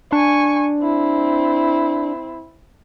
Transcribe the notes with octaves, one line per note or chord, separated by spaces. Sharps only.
D4 G#5 C#6
C4 E4